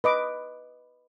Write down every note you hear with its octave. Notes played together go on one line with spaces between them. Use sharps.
B4 D#5 D6